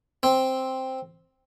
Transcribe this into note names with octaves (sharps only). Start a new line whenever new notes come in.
C4